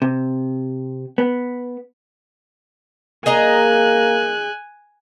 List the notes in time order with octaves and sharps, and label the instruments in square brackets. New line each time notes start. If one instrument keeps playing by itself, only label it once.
[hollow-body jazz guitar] C3
B3
[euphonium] A#3 [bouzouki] G#4 D#5 A#5 [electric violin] G#5 F#6